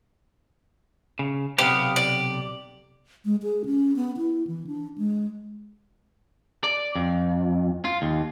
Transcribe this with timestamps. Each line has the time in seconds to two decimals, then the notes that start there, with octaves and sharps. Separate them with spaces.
1.19 C#3
1.59 B1 C3 B3 G4 F5
1.96 D5
3.25 G#3
3.43 G#4
3.65 C#4
3.96 B3
4.17 E4
4.47 E3
4.67 D4
4.98 G#3
6.64 D5
6.95 F2
7.85 F4
8.02 D#2